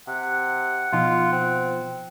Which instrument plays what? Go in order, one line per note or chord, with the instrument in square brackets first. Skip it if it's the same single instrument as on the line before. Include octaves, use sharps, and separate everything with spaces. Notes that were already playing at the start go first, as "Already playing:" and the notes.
[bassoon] C3 [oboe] F#5
[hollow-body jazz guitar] B2 F3 D#4 [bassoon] F4
[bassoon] C4